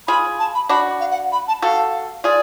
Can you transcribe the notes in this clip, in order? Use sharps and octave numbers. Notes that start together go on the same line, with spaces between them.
F4 G#4 B5
A5
B5
D4 F#4 B5
F5
F#5
B5
A5
F#4 A4 F5
F4 G#4 D5